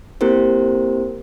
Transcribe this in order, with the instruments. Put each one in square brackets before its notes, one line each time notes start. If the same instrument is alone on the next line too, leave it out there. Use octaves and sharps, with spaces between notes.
[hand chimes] A#3 C4 E4 G4 A#4 C5